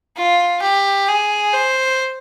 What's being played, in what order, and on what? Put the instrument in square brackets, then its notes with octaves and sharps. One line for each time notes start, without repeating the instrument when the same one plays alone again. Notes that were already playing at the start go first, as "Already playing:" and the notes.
[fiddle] F4
G4
G#4
C5